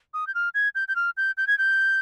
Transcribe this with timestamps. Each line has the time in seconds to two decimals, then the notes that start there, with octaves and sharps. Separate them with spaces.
0.14 D#6
0.27 G6
0.35 F6
0.54 G#6
0.75 G6
0.88 G6
0.96 F6
1.17 G6
1.37 G6
1.47 G#6
1.58 G6